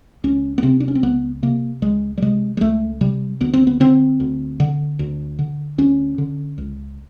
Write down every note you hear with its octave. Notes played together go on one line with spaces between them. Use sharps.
C#2 C#4
B3
C3 C4
D4
C#4
C4
C#2 B3
C3 A#3
C#2 G#3
G3
C3 G#3
G#3
C#2 A3
C3 G3
D2 B3
C4
B3
D3 C4
D2
D3
D2
D3
D2 C#4
D3
C#2